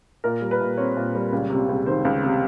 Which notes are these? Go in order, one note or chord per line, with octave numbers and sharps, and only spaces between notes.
A#2 A#4
G3
B4
A#2
C4 C#5
A#2
G3
C#2
C3
C#2
D#3 C5
C#2
C3